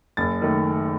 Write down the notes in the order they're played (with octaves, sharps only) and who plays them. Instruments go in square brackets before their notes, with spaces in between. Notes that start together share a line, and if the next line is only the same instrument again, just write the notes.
[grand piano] F#1 A6
D#3 A3